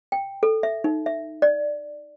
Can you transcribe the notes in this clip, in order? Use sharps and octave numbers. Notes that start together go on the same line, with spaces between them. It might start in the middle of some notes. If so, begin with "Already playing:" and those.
G5
A4
E5
D#4
E5
D5